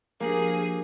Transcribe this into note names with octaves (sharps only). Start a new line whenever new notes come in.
F3 A#3 D4 G4 G#4 A#4